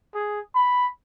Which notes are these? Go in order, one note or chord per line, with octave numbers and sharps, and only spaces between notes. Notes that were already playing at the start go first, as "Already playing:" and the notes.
G#4
B5